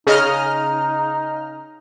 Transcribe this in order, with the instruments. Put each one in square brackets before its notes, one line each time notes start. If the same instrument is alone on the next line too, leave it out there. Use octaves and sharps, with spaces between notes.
[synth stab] C#3 D#5 F6 [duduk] D#4